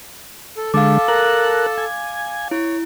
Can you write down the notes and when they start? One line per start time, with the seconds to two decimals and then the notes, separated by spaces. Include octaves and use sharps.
0.57 A4
0.74 D3 G#3 A4 F5 A5 D6
1.08 A#4 A#5 F#6
1.78 G#5
2.51 E4 C#5